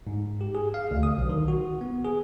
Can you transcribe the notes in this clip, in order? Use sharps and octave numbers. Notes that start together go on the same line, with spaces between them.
G#2
G4
G#4
F5
D2
D#6
B1
D#3
F#4
B3
G#4